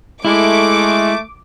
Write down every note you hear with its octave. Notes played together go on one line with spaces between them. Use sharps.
G#3 A3 E4 D6